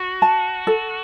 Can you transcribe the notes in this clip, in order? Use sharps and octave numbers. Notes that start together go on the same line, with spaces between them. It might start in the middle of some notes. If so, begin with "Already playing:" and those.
Already playing: F#4
A5
A4